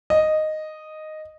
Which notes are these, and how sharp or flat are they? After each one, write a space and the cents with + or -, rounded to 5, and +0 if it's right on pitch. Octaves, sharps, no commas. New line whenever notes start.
D#5 -5